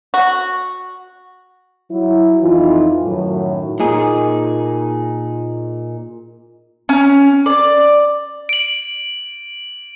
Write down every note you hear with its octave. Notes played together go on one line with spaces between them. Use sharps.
F#4
F#3 E4
F2 E3 D#4 F4
F#2 A2 D#3 F#3
A#2 D#4 G#4
C#4
D5
D7 F#7